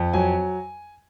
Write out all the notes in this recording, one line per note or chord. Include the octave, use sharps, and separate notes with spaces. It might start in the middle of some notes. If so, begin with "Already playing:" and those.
Already playing: F2
F#3 G#5